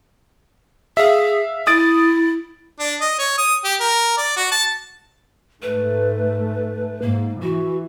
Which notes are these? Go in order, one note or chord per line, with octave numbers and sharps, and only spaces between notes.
G#4 E5 F5
E4 D#6 A6 D7
D4
D#5
C#5
D#6
G4
A#4
D5
F#4
A5
G#2 A3 B4
G#2 A#3
E3 F#4